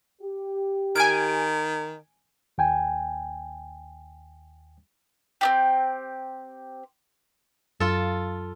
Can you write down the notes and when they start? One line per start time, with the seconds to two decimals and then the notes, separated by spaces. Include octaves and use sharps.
0.22 G4
0.96 D#3 G#5 F6 G#6 D7
2.58 D#2 G5 G#5
5.41 C4 D4 G4
7.80 F#2 F4 A4